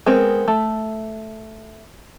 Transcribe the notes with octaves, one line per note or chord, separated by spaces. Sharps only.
G#3 B3 C4 A#4
A3